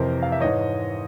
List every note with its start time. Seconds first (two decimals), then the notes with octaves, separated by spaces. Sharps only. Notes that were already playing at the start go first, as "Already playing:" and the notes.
Already playing: F2 C3 E3 A#4 C5
0.23 F5
0.32 E5
0.40 G#2 E3 C#5 D#5